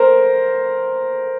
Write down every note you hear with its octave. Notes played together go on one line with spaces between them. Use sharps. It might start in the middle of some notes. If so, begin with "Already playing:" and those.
Already playing: A#4 C5